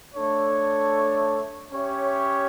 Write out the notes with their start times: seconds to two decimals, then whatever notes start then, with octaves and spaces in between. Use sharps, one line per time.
0.15 A3 D4 A4 C#5
1.72 C#4 G4 C#5 E5